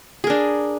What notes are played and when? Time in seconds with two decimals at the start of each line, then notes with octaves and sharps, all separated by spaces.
0.24 G#4
0.27 A#4
0.30 D4